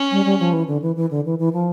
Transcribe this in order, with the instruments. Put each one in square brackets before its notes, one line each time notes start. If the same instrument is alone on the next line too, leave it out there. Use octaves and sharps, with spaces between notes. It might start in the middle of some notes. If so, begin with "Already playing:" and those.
Already playing: [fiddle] C#4
[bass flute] G3
G3
F3
E3
D3
E3
E3
D3
E3
E3
F3